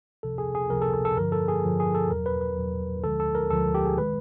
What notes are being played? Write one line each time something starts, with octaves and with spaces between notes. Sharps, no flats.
C#2 C3 F3 A4
G#4
G#4
C#2 C3 F3 A#4
A4
A4
A4
G2 D3 F3 A#4
A4
G#4
G2 D3 F3
G#4
A4
E2 B2 F#3 A#4
B4
B4
E2 B2 F#3
D2 D3 F3 G#3 A4
A4
A#4
D2 D3 F3 G#3 A4
G4
G#4
D#3 G#3 B4